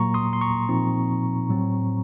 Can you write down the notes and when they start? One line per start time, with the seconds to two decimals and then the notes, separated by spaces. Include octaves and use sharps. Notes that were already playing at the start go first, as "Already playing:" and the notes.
Already playing: A#2 F#3 A#3 A#5 C#6
0.14 C6 D#6
0.33 C6
0.41 A#5 C#6
0.69 A#2 F3 C4 D#4
1.49 A2 F#3 C4